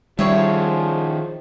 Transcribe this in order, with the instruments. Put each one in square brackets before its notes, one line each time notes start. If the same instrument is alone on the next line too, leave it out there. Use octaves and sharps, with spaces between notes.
[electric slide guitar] D#3 C#4 [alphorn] F3 [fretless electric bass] G3 [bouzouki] E4 G#4 C#5